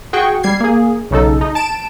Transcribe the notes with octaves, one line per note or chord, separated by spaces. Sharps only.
F#4 G#4 G5 C#6
G3 G#6 C7
A#3 G#4
B1 C#3 D#4 A4
D#4
A5 D7 E7